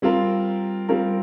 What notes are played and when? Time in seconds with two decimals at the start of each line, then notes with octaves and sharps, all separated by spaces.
0.02 G3 C4 F4 A#4
0.89 G3 C4 F4 A#4